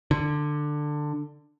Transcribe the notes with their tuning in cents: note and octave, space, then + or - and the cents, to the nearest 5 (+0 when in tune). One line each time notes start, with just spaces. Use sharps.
D3 +15